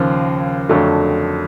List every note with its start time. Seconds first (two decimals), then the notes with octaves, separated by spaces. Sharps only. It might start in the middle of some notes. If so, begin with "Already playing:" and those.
Already playing: D#2 C#3 F3
0.69 F2 D3 F#3 A3